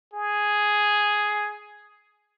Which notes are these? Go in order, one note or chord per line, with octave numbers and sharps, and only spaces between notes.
G#4